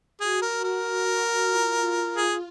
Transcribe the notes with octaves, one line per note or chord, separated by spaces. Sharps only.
F#4 G#4
A#4
A#4
F#4
F#4
F4
G#4